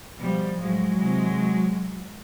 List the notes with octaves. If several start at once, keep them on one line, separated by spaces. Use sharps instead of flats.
B2 F3 G3
A2 F3 F#3 G#3
C3 E3